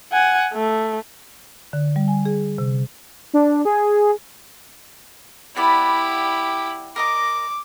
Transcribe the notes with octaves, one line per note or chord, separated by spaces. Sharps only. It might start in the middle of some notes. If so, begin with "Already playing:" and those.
F#5 G#5
A3
D3
G3
G#5
G#4
C3
D4
G#4
B3 E4 G4 D5 B5
A#4 D#5 A#5 D6